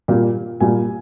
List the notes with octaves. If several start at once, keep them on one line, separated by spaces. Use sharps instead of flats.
A#2 G3 A#3
A#2 G3 A#3 G#5